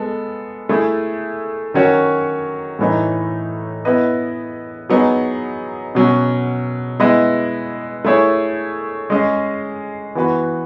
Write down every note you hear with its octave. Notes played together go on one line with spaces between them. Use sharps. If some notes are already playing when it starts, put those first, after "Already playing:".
Already playing: G#3 B3 A4
A3 E4 G#4
D#3 F#3 C#4 F#4 C#5
A2 E3 A3 D#4
B3 E4 B4 D#5
F#3 B3 D#4 G#4
B2 F#3 C#4
G#3 B3 E4 B4 D#5
A3 E4 G#4 C#5
G#3 C#4 G#4 D#5
E3 B3 F#4 B4